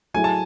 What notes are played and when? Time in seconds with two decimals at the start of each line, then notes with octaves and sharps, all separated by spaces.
0.14 F#3 A3 E4 G#4 G#5
0.24 A5